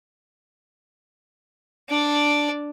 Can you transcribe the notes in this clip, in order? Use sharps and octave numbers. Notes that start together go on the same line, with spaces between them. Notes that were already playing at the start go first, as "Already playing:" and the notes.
D4 D5